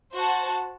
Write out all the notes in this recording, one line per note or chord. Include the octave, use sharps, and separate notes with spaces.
F#4 C5 F#5 A5